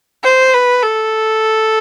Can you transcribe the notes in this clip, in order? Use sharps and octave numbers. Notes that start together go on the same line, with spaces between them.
C5
B4
A4